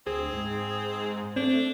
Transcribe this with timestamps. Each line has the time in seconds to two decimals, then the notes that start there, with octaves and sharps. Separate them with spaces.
0.07 D2 C4 G#4
0.33 G#2
1.36 A3 C4 D4